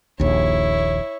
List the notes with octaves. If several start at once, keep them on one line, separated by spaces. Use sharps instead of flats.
D#1 A#1 D#2 E4 C#5